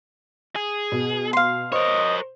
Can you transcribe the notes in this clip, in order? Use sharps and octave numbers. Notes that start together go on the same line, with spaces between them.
G#4
B2
F5 C6
A#4 C5 C#5 D#5